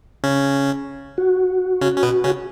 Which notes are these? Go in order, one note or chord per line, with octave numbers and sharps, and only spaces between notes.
C#3 C#4
F#4
C#3 C#4
C#4
B2 B3
C#3 C#4